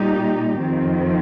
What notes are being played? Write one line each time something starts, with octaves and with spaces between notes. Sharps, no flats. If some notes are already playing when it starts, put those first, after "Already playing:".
Already playing: A#2 G3 D#4 G4
F2 D#3 C4